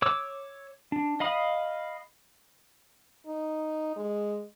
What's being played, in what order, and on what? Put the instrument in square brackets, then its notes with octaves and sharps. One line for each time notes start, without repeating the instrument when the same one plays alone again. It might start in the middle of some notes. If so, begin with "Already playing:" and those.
[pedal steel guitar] C#5 D6 E6
D4
D#5 F5 B5 D#6
[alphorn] D#4
G#3